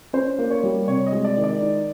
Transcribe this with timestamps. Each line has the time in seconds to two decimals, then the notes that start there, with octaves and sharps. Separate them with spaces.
0.13 C#4 C5
0.39 A#3
0.51 C#5
0.63 G3
0.88 C3 C#5
1.06 D#5
1.13 G#3
1.24 D5
1.37 D#3
1.44 D5
1.61 D#4